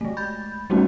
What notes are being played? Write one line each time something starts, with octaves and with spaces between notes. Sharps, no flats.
G#3 A3
B5 G6 A6
G3 A3 B3 C#4 D#4 F#4